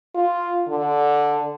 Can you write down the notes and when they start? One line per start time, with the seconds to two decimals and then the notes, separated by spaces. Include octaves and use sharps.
0.15 F4
0.68 D3